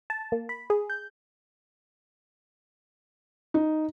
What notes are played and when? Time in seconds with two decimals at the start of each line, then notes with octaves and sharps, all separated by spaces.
0.10 A5
0.32 A#3
0.49 B5
0.70 G#4
0.90 G6
3.54 D#4